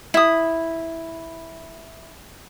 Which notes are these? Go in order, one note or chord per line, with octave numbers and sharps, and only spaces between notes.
E4 D#6